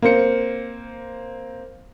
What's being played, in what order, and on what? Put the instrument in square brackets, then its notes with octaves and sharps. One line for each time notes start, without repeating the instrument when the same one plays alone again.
[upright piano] A#3 C4 C5 C#7